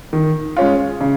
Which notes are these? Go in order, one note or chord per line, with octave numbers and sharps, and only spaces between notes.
D#3
G#3 C#4 F4
C#3